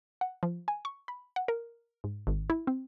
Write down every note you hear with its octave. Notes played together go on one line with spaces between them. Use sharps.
F#5
F3
G#5
C#6
B5
F#5
A#4
G#2
G#1
E4
C4